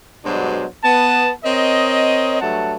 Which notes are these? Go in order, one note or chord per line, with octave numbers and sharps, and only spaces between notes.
G2 B2 F#3 G#3 D4 C5
B3 A5
C4 A#4 C#5 D#5
G2 F#3 A3 F#5 A5